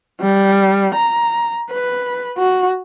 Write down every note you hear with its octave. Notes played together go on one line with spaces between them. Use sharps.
G3
A#5
B4
F#4